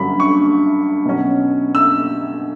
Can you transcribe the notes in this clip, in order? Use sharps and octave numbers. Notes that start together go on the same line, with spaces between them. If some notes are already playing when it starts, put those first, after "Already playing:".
Already playing: G2 D3 F#3 C#4 B5
C#6
B2 F#3 C#4
E6